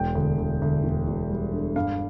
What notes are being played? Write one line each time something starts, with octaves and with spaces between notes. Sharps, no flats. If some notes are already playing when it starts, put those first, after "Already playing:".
Already playing: E1 G5
D2
D2
D2
E1
E1
G3
D3
G2 F5